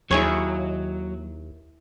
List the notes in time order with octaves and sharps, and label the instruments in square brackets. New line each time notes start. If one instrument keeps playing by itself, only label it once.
[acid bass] D#2 [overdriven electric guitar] F#3 [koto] E4 G#4 C#5